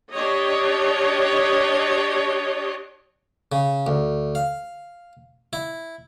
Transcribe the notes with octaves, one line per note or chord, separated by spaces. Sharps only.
D4 G4 C#5 D#5
C#3
D2
F5
E4